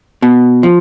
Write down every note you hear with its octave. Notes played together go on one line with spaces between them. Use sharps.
B2
F3